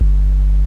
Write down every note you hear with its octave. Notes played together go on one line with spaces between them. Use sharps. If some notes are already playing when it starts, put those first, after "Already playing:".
G1